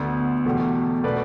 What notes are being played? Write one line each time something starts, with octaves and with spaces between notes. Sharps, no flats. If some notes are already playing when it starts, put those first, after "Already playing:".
Already playing: D2 D3 B3
E2 B2 A3 G4
B2 A3 D4 B4 D5